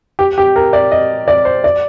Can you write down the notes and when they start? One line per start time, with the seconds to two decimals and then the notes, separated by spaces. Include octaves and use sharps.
0.19 G4
0.38 G4
0.56 A#4
0.73 D5
0.92 D#5
1.28 D5
1.45 C5
1.64 D5